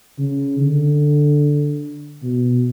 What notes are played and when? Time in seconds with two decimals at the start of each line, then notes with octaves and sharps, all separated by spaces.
0.18 C#3
0.59 D3
2.22 B2